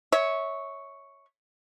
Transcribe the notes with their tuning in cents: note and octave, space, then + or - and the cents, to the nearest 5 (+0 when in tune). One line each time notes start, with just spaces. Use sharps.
C#5 +0 E5 -25